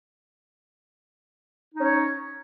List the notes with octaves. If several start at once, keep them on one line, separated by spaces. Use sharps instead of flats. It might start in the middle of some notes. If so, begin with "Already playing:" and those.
C#4 D#4 C#5